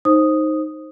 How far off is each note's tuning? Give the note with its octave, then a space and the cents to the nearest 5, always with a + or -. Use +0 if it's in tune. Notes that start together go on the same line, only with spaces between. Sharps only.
D#4 +0 C5 +15 D#6 +0